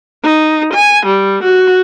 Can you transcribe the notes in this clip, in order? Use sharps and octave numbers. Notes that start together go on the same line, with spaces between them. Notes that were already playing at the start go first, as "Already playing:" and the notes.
D#4
G#5
G3
F#4